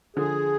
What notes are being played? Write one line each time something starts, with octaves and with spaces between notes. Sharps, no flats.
D3 F3 G#4